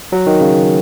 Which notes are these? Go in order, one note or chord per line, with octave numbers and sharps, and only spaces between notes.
F#3
D#3
C#3